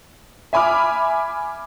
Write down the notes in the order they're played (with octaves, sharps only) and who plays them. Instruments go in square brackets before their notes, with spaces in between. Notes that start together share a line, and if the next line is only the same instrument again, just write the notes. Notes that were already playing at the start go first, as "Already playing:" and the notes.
[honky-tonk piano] E5 G#5 B5 D6 F6